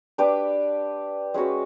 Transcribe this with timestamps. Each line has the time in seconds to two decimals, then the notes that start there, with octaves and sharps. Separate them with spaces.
0.18 D4 G4 B4 D5
1.34 G#3 C#4 F#4 B4